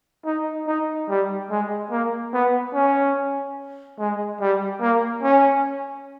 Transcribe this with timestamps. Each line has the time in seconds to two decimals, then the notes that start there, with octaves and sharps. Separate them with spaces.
0.26 D#4
0.67 D#4
1.09 G3
1.51 G#3
1.91 A#3
2.34 B3
2.74 C#4
3.99 G#3
4.41 G3
4.81 A#3
5.23 C#4